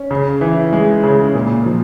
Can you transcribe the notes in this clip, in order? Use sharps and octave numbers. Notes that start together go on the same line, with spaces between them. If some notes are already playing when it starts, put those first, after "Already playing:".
Already playing: C#4
C#3
E3
G#3
C#3
A#2
F3